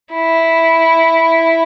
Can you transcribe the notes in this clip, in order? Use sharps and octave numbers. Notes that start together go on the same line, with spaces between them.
E4